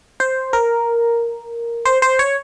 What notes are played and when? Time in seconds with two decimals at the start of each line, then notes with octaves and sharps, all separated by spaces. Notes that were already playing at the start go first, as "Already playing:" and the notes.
0.20 C5
0.53 A#4
1.85 C5
2.02 C5
2.19 C#5